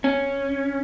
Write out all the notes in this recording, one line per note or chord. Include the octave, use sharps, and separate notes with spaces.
C#4